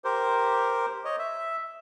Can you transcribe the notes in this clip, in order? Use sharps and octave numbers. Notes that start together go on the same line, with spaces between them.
G4 A#4 C5
C#5 D#5
E5